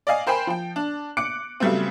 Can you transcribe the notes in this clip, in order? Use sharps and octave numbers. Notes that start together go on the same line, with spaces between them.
D5 D#5 F5 G#5
A#4 C5 G5 G#5 B5
F3 G5
D4
D6 F#6 C#7 D7
C#3 F#3 G3 A3 B3 C4